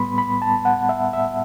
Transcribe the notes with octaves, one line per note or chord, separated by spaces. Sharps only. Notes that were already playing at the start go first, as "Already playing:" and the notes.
Already playing: A2 G3 B3 B5 C6
B5
A5
F#5
E5
E5